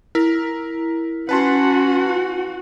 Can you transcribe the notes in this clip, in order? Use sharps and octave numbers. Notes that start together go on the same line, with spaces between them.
E4 A#4
C#4 F#4 B4 F#5 A5 C6